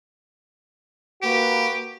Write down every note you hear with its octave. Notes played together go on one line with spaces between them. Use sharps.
A#3 F#4 G4 B4